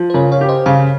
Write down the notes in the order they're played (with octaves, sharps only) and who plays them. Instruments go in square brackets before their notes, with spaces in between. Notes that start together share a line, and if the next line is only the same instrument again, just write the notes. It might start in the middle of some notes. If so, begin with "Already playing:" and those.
Already playing: [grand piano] F3
[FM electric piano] C5
[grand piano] C#3 [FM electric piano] A#4 C#5
[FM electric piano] C#5 F5
[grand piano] G4
[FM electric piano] C5 D#5
[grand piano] C#3 [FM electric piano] C#5 F5